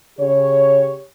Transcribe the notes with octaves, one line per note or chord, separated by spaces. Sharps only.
C#3 G4 C#5